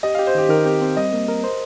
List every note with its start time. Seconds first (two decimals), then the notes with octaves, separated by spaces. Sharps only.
0.03 G4 D#5
0.15 G4 F5
0.27 C5
0.35 D#3 G4
0.49 D#3 A#4
0.65 C4 G4
0.81 C4
0.97 G3 D#5
1.13 A#3
1.28 A#4
1.44 C5